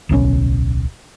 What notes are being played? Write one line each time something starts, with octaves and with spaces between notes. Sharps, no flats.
D1 B1 C#3 C#4